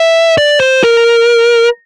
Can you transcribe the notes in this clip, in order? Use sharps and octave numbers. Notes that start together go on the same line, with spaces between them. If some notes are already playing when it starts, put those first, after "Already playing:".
Already playing: E5
D5
C5
A#4